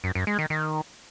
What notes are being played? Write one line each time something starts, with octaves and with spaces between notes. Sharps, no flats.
F#2
F#2
G#3
D#3
D#3